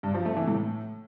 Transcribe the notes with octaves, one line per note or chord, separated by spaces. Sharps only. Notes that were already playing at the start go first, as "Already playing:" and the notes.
G2
F3
A3
E3
A2